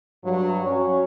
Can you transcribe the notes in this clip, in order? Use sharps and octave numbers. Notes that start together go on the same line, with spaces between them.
G2 F#3
C#4 F#4 C#5